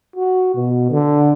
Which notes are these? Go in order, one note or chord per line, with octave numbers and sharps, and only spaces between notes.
F#4
B2
D3